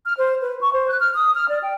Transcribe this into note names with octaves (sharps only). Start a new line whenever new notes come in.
F6
C5
B4
C#6
C5
F#6
F6
D#6
F6
D5
G5